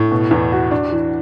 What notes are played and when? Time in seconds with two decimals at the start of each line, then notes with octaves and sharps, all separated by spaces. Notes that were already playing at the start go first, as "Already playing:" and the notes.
Already playing: A2
0.12 B2
0.31 E2
0.52 F#4
0.71 D4
0.92 E3